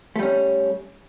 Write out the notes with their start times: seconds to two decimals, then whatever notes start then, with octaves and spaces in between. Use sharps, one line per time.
0.16 A3
0.19 G3
0.23 C#4